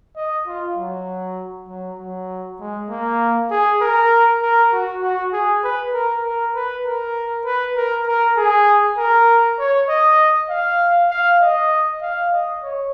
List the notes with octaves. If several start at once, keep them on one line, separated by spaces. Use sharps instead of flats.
D#5
F4
F#3
F#3
F#3
G#3
A#3
G#4
A#4
A#4
F#4
F#4
G#4
B4
A#4
A#4
B4
A#4
B4
A#4
A#4
G#4
A#4
C#5
D#5
F5
F5
D#5
F5
D#5
C#5